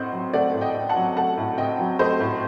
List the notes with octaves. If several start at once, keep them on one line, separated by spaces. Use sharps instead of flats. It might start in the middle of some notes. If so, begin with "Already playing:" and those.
Already playing: A2 C4 C5 D#5 F#5
F#3
A3 D5 F#5
A2
D#5 G5
C4
F#5 A5
F#3
A3 F#5 A5
A2
C4 D#5 G5
F#3
A3 C5 D#5
A2